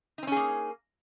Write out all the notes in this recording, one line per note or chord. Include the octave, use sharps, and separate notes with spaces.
A#3 C4 C#4 D#4 G#4